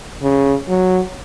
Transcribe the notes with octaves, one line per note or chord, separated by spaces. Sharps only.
C#3
F#3